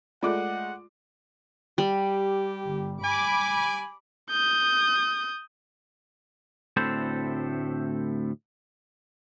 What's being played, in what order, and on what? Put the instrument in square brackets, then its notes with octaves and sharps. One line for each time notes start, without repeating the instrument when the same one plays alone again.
[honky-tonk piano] G#3 A3 [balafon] F4 [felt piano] D5 D6 [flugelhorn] F#5
[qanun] G3 [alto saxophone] G4
[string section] G1
[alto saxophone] G#5 [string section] B5 D6
[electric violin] D#6 G6
[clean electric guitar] D2 A2 C4 A4 B4 C5